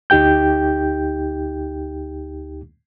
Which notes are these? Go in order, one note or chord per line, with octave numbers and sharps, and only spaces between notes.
D2 D#4 G4 G5 G6